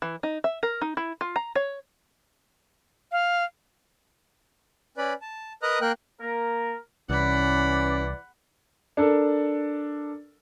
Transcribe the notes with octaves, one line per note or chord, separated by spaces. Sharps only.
E3
D#4
E5
A#4
D#4
E4
F4
A#5
C#5
F5
C#4 B4 D5 B5
A5
A#4 B4 D#5 A#5 D#6 F#6
A#3 A#4 G5 F#6
A#3 A#4
C2 E3 C#4 D5 F#5 B5
D4 A4 A#4